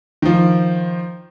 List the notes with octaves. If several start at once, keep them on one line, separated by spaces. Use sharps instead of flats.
D#3 F3